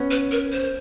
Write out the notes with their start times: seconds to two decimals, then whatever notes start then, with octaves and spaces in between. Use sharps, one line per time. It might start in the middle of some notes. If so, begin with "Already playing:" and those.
Already playing: B3 C#4
0.11 B4
0.31 A#4
0.52 C5